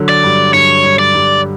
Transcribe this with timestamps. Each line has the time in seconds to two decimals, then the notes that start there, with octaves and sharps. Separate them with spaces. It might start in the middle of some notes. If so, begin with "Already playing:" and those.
Already playing: D3 F#3
0.09 D5
0.24 G2
0.54 G2 C#5
0.84 G2
0.99 D5
1.14 G2